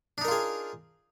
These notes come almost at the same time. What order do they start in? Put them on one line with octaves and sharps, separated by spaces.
D4 D#4 A#4 F4 G#4